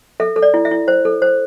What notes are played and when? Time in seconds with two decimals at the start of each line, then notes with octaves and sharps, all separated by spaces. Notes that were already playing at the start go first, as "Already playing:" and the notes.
0.20 A4 E5
0.36 A4
0.42 D5
0.54 E4
0.65 E5
0.71 E4
0.88 C5
1.05 A4
1.22 C5